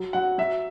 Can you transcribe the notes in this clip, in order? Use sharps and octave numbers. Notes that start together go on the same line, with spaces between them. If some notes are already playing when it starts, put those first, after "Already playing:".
Already playing: F#3
F#3 F#5
F#3 E5